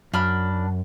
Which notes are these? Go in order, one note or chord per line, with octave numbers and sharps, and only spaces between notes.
F#2 D4 B5 F6